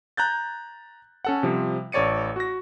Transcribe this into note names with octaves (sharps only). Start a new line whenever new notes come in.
A#5 F#6 G6 A6
C#4 A4 F#5
C3 F3 G3
A1 A4 C#5 D5 C#7 D#7
F#4 A#6